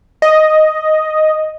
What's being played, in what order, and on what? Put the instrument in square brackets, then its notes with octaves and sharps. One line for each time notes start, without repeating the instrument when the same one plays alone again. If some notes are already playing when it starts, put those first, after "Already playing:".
[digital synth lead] D#5